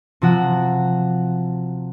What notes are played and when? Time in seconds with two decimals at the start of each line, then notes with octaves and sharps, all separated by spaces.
0.22 C3 F3 F#4